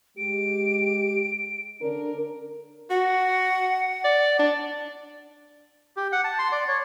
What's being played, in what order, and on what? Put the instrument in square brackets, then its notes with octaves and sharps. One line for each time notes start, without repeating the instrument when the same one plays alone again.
[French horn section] G#3 G4 [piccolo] D7
[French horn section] D3 C#4 D4 [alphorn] A#4
[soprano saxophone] F#4 [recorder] F#5
[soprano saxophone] D5
D4
[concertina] G4
F#5
A5
C6
D5
C#5